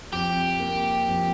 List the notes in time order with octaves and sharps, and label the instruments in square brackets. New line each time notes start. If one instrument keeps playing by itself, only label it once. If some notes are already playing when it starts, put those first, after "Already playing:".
[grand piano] F2 [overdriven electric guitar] G4
[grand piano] A#3
F2